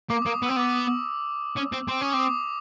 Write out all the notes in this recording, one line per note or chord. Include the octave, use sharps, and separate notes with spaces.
A#3 D6
D#6
A#3
D#6
B3
E6
C4
B3 D6
C#4
C4
C4
C#4 D#6
C4 D6
D#6